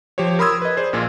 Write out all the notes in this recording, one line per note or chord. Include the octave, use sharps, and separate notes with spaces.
F3 G4 C5 C#5
A#4 B5 C6 D#6 E6 G#6
B4 D#5
G#4 C5 D5
A#1 A#2 F4